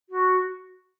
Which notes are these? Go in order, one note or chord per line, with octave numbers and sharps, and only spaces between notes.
F#4